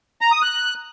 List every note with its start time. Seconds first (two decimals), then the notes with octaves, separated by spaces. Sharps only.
0.21 A#5
0.32 D#6
0.42 F#6